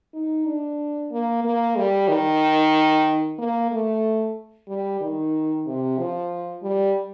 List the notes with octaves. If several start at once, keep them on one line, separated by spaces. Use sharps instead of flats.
D#4
D4
A#3
A#3
G3
D#3
A#3
A3
G3
D#3
C3
F3
G3